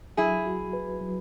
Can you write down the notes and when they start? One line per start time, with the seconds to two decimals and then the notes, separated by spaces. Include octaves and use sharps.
0.17 F#3 E4 G#4
0.46 F#4
0.73 B4
1.01 F#3